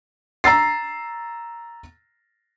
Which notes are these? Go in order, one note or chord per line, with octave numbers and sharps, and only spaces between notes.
A#5 E6 A6 C7